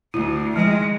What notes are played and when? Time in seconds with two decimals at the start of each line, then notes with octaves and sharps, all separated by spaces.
0.14 D2 E4
0.56 D#3 F3 G#3